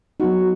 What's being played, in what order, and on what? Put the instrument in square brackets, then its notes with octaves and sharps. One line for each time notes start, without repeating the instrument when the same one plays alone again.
[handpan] F#3 B3 D#4 [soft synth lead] F#4